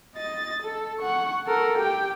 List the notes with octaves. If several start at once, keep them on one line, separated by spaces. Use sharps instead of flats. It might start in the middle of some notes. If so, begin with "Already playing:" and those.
D#5 A6
A4
F#5 C#6
A4 A#4
G4 G5